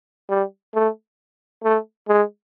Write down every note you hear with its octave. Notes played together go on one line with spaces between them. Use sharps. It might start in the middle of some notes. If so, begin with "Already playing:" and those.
G3
A3
A3
G#3